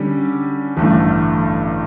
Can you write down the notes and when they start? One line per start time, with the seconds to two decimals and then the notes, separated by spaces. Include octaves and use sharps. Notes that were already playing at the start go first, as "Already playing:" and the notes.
Already playing: D3 G3 C#4 G4
0.77 A1 G2 D3 A3